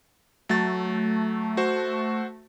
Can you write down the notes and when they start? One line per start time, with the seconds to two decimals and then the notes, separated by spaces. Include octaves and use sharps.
0.49 F#3 A3 A6
1.57 F#4 C5